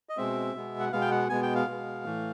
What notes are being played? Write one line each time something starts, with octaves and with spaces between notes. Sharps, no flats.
D#5
B2 G#3 C4 E5
B2 G#3 B3
F#5
B2 G#3 B3 F5
G5
F#5
B2 G#3 B3 G#5
G5
F5
B2 G#3 B3
A2 E3 A3